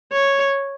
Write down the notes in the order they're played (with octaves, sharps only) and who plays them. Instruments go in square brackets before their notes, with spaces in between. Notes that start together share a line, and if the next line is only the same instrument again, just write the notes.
[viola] C#5